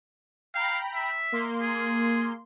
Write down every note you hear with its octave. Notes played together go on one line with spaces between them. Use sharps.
F5 G5 A#5 B5
E5
A#3 C6
G#4